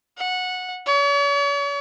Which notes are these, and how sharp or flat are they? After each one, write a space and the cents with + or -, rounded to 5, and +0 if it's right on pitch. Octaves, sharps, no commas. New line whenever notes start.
F#5 -15
C#5 +45